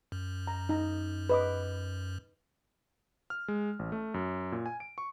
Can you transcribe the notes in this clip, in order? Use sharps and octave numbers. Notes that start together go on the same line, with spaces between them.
F#2
A#5
D#4 A#5
B4 D#5 D6
F6
G#3
A1
A3
F#2
A#2
G#5
D7
C#6